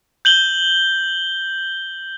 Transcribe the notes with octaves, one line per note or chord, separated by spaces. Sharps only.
G6 F#7 G7